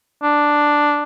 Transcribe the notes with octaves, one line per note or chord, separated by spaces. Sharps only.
D4